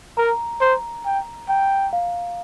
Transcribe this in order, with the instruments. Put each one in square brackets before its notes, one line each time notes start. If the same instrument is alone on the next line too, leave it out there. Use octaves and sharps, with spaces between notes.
[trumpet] A#4 [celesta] A#5
[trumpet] C5 [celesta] A#5
[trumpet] G5 [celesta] A#5
[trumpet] G5 [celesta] A#5
[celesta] F5